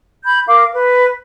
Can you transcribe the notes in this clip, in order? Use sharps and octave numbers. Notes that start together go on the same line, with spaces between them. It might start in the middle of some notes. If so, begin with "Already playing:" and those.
B5 G6
A#4 F5 D6
B4